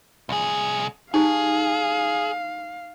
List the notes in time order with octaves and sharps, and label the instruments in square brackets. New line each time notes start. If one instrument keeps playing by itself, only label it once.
[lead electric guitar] C2 G#4
[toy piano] D#4 G4 A5 [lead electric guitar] G#4 [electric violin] F5